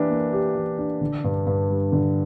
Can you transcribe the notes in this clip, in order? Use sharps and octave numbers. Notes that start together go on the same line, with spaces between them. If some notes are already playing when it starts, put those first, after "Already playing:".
Already playing: E3 A#3 D4 G4
A#3
G4
E3
D4
D3
G2
G2
G3
D3